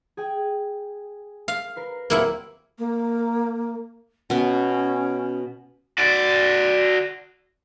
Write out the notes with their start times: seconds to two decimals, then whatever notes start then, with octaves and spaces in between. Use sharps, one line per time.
0.17 G#4 G5 G#5
1.48 F5
1.76 A#4 B4 C7
2.10 D#1 F#3 A#3 C4 E4 F#5
2.78 A#3
4.30 B2 B3 C#4
5.98 F#4 D5